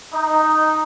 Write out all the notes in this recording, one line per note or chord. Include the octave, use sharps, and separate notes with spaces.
D#4